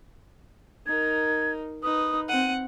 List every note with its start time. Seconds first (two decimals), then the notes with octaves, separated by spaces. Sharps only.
0.86 D#4 A#4 G#6
1.83 D#4 B4 D#6
2.29 C4 F#5 D#7